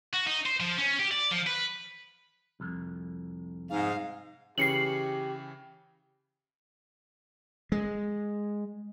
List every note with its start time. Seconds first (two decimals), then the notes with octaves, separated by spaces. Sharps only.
0.13 F#4
0.27 D#4
0.46 C5
0.60 F3
0.78 C#4
1.00 G4
1.11 D5
1.31 F3
1.47 B4
2.60 C2 F2
3.70 G#2 F5
4.58 C#3 E3 C#4 G4 C7 C#7 F#7
7.72 G#3